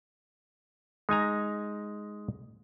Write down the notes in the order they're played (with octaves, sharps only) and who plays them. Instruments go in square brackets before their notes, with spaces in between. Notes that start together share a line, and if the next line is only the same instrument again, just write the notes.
[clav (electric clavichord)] G#3 D#4 G#5 A#5